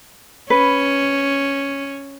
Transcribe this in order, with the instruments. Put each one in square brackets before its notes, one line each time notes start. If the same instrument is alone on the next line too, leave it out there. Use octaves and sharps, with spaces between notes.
[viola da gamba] C#4 [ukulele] B4